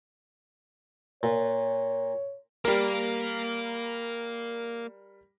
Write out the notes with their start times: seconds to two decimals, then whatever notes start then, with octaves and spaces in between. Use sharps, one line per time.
1.23 A#2 C#5
2.65 G3 A#3 A#4 F5